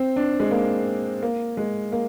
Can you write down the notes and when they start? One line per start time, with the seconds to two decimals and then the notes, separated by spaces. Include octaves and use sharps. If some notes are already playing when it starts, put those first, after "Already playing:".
Already playing: C4
0.16 D4
0.40 G#3
0.51 A#3
1.23 A#3
1.57 G#3
1.92 A#3